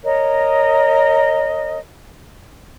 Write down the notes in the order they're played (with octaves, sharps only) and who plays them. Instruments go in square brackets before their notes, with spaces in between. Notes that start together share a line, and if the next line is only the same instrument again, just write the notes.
[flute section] A#4 C#5 D#5